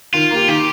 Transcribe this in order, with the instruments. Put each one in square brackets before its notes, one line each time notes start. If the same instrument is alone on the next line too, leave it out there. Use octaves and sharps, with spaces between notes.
[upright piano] D#3 [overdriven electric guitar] F4
[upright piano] A#3 G4
[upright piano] D#3 [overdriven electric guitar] G4